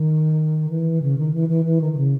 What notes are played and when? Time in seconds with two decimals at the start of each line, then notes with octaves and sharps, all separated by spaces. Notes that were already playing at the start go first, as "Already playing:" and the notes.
Already playing: D#3
0.69 E3
1.01 C#3
1.17 D#3
1.33 E3
1.49 E3
1.65 E3
1.81 D#3
1.92 D#3
1.97 C#3